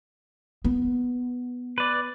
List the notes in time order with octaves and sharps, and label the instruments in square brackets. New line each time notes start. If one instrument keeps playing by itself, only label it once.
[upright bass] B3
[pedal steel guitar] B4 D5